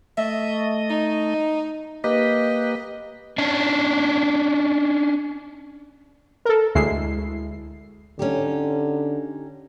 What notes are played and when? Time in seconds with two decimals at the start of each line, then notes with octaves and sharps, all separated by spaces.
0.17 A3 D#5 E5
0.90 D#4
2.04 A#3 G4 B4 D#5
3.38 C#4 D4
6.45 A4 A#4
6.75 D2 G#3 E4 C7
8.19 D3 C#4 D#4 G4